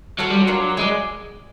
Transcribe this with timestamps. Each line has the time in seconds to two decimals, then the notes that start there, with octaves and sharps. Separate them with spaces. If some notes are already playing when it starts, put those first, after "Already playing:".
0.19 F#3 F4 A4 C#5 F#5
0.30 G3
0.42 F#3
0.47 D4 F4 A#4 C#5
0.77 G#3 G#4 B4 D5